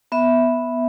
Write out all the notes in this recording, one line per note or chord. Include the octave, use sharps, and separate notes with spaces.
B3 E5